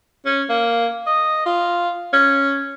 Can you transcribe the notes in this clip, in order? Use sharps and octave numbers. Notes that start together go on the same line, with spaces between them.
C#4
A#3
D#5
F4
C#4